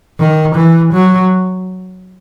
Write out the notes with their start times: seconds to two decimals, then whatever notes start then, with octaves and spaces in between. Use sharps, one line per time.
0.19 D#3
0.56 E3
0.93 F#3